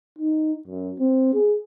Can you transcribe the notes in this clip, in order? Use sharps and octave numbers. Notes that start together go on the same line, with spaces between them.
D#4
F#2
C4
G#4